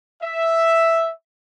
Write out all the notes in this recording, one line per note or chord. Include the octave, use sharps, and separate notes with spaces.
E5